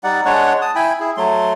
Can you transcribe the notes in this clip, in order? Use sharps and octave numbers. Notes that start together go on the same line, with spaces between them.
G3 D#4 D5 F#5
G#3 D4 C#5 F#5
A5 D#6
E4 G5 G#5 B5
E4 G#4
F#3 A3 C6